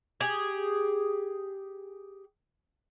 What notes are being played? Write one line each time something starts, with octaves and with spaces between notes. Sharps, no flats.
G4 G#4